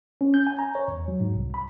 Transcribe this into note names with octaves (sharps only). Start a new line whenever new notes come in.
C#4
G6
G#5
A#5
C#5
E2
F#3
G#2
C2
B5